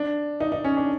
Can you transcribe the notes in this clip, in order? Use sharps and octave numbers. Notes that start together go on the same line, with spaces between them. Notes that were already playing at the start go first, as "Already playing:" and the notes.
Already playing: D4
D#4
D#4
C#4
D4